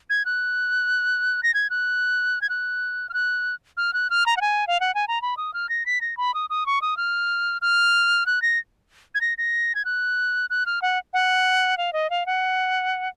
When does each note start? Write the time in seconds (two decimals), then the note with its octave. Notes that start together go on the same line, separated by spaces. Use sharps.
0.10 G#6
0.25 F#6
1.43 A#6
1.54 G#6
1.70 F#6
2.42 G#6
2.49 F#6
3.09 F6
3.14 F#6
3.77 F6
3.93 F#6
4.10 F6
4.26 A#5
4.37 F#5
4.41 G#5
4.67 F5
4.80 F#5
4.95 G#5
5.08 A#5
5.22 B5
5.37 D#6
5.54 F6
5.69 A#6
5.86 B6
6.01 A#6
6.17 B5
6.34 D#6
6.50 D#6
6.66 C#6
6.82 D#6
6.97 F6
7.62 F6
8.26 F#6
8.42 A#6
9.15 G#6
9.21 A#6
9.38 A#6
9.75 G#6
9.85 F#6
10.50 F#6
10.66 F6
10.82 F#5
11.13 F#5
11.77 F5
11.93 D#5
12.10 F5
12.26 F#5